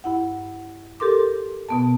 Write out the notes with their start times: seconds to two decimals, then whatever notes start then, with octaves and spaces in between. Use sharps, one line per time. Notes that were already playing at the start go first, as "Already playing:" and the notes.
0.04 G2 E4 F#5
1.00 G4 A4 A#4 C6 D6
1.69 B2 B3 A5